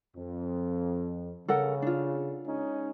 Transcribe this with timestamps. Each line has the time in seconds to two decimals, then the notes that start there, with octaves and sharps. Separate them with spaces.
0.17 F2
1.48 C#3 A4 A#4 F#5
1.82 D4 F4
2.46 G#3 C#4 D#4